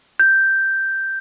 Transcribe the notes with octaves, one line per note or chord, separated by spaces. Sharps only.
G6